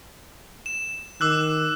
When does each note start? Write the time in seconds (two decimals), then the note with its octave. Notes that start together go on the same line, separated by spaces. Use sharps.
0.66 E7
1.21 D#3 D6 E6 F#6